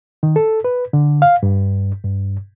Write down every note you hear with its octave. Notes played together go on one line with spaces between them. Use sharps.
D#3
A4
B4
D3
F5
G2
G2